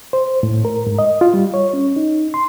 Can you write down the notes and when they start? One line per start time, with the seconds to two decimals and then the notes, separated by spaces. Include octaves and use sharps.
0.13 C5
0.43 A2
0.65 A#4
0.87 G#2
0.99 D#5
1.21 F4
1.34 G3
1.54 C#5
1.73 C#4
1.96 D#4
2.34 C6